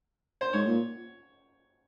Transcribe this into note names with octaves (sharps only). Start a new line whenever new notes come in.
C5
G#2 C#5
A#2